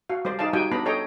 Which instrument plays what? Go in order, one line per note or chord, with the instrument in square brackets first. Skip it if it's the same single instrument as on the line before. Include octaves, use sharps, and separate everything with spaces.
[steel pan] F#4 F5
G3 G4 C5 D5
D#4 G#4 D5 F5 A5
G3 D#4 F#4 G4 G5 G#5
B3 D4 G#4 A#5 B5
G#4 A4 C#5 D#5 G5 A#5